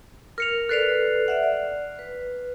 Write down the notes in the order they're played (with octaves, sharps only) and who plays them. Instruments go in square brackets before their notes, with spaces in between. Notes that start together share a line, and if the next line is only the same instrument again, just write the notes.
[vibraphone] A#4 [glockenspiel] F6 C#7 F7
[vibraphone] A4 B4 D5 [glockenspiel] F#6 C7 F7
[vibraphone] D5 E5 F#5
D5
B4